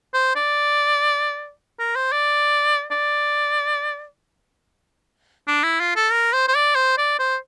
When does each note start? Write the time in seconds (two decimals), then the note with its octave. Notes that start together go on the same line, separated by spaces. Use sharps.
0.14 C5
0.36 D5
1.79 A#4
1.96 C5
2.12 D5
2.91 D5
5.47 D4
5.63 E4
5.80 F4
5.96 A4
6.12 A#4
6.33 C5
6.48 C5
6.55 D5
6.75 C5
6.98 D5
7.19 C5